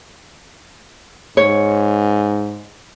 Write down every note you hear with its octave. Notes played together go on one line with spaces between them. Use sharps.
G#2 C#5